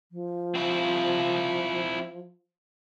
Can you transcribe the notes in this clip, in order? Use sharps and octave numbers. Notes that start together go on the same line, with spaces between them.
F3
C4 E4